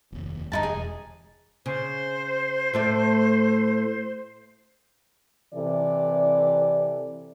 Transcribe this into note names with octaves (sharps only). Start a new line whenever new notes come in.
F1 D#2
G2 D3 D#4 E4 A5
E1 G#4
C#3 C5
A2 A3 D5
C3 E3 A4 D5